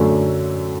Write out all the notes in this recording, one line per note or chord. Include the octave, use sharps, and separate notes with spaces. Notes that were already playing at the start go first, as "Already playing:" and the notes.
Already playing: F#2 D3 F#3 A3